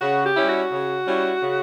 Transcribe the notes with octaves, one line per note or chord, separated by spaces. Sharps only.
C#3 F#4
G4
G3 C#4 E4
F#4
C#3
G3 C#4 E4
C#3